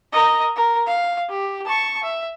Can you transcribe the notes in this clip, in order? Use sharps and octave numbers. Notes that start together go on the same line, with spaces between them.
A#4 D#5
A#4
F5
G4
A5 C#6
E5